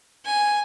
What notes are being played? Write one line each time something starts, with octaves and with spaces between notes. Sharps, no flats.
G#5